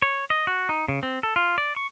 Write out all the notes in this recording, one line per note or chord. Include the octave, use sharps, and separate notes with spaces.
C#5
D#5
F#4
D#4
C#3
C4
A4
F4
D5
C#6